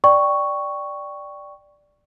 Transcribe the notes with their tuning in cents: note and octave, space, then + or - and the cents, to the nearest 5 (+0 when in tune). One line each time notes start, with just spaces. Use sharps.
D5 +0 G5 +0 C#6 +0